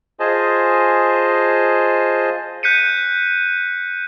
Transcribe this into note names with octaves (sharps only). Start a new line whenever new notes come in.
F4 G#4 C5 D#5 G#5 A5
F#6 G6 B6 C#7 D#7